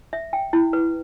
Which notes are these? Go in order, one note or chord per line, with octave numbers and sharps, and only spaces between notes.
E5
G5
E4
B4